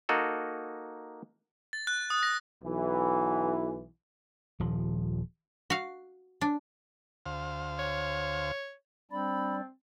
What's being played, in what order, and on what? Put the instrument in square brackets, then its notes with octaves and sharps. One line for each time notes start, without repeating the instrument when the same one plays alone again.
[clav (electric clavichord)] A#3 D#4 F#4 A4
[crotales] A6
F#6
D#6
A#6
[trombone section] B1 E3
[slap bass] D#1 F3
[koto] F#4 F5
D4
[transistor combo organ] D2 C5 F5
[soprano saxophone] C#5
[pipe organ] G3 D4 D5 [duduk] C4 [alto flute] B5